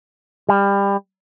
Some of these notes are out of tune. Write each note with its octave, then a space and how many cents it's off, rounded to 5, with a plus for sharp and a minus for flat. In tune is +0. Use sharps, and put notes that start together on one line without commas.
G3 +25